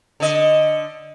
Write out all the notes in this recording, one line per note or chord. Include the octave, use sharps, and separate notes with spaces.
D3 D#5